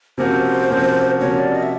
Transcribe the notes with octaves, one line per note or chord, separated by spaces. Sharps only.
C3 F3 A#3 C#4 F#4 C5
C3 F3 A#3 C#4 F#4
C3 F3 A#3 C#4 F#4 C#5
D5
D#5
E5